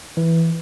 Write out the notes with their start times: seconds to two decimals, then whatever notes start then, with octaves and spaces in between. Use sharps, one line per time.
0.17 E3